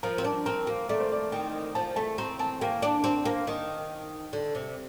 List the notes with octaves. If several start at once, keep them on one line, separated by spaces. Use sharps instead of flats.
F3 A#4
C4
D4
C4 A#4
A#3
A3 D5
C5
D5
D#3 G5
F3 A5
A3 A5
C4 A#5
C4 A5
A#3 G5
D4
C4
A#3
D#3
D3
C3